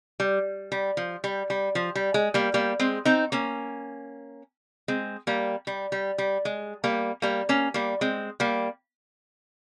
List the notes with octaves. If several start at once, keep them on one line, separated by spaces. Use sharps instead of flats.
G3
G3
F3
G3
G3
F3
G3
G#3
G3 A#3
G3 A#3
G#3 C4
C4 D#4
A#3 C#4
G#3 C4
G3 A#3
G3
G3
G3
G#3
G3 A#3
G3 A#3
A#3 C#4
G3 A#3
G#3 C4
G3 A#3